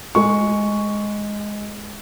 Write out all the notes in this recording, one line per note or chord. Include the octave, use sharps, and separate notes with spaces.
G#3 C#6